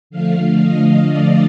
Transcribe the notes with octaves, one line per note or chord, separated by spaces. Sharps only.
D3 F3 A3 F5
D#5
D5